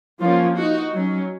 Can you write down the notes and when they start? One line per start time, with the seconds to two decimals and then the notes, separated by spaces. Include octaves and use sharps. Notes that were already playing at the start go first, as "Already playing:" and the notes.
0.20 F3 A#3 C#4 F4
0.56 D#4 F#4
0.93 F#3 C#4